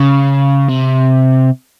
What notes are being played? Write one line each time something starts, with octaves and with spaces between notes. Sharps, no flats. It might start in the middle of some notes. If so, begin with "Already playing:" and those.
Already playing: C#3
C3